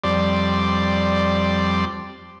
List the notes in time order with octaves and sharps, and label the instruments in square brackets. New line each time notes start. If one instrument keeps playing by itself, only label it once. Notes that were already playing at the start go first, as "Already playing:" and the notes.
[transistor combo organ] F2 G3 D5 C6